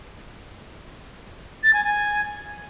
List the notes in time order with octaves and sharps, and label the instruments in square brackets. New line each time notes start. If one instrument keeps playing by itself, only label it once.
[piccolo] A6
G#5
G#5